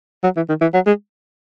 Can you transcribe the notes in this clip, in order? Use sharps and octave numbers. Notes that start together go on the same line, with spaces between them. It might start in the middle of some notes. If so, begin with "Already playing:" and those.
F#3
E3
D#3
E3
F#3
G#3